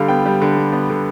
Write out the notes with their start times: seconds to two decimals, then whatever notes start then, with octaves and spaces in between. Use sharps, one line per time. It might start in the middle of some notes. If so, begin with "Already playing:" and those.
Already playing: D3 G3 F5
0.08 B3 G5
0.26 G3
0.42 D3
0.56 G3
0.73 B3
0.90 D3